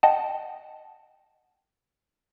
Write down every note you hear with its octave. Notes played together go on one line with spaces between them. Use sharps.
D#5 F#5 G5 A5